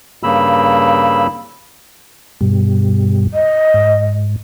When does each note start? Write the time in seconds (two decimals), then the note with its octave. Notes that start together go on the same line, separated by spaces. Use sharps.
0.23 G2 C#3 A#3 B5 E6
2.41 G2 B2 G3
3.34 D#5
3.74 G#2